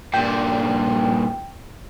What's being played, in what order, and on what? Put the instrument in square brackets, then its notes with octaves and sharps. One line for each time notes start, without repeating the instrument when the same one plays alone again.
[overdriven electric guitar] G2 A#2 [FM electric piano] G5